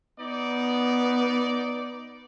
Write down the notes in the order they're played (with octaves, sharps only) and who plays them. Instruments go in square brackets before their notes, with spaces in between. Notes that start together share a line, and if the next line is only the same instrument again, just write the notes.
[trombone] B3 [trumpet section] D#4 D5